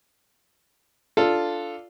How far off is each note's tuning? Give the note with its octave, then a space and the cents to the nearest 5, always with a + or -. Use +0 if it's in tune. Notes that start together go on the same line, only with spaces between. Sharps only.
D4 +0 F4 +0 A4 +0